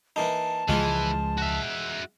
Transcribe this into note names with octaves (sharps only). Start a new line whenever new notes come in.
E3 A#3 D#4 A5
C#2 E3 F3 G#3 F4
F#4 E5